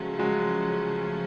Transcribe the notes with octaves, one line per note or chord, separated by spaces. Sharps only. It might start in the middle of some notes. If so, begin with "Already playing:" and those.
Already playing: C#3 F3 F#3 G#3 A3 C#4
F#3 G#3